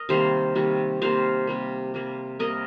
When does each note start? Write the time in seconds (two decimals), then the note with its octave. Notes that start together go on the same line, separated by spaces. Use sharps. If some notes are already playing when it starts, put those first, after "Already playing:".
Already playing: A#4 D#5
0.09 C3 D#3 G3 A#3 C5 F5
0.55 C3 D#3 G3 A#3
1.02 C3 G3 A#3 C5 F5
1.47 C3 G3 A#3
1.94 C3 G3 A#3
2.39 C3 G3 A#3 A#4 D#5